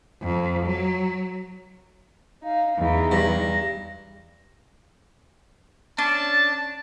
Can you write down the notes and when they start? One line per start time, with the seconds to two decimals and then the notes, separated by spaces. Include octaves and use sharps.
0.22 F2
0.66 F#3
2.44 D#4 F5
2.77 E2 D#4
3.11 G2 A#6
5.98 C#4 D4 A5